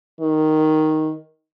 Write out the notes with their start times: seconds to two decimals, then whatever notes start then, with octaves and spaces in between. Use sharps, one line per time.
0.21 D#3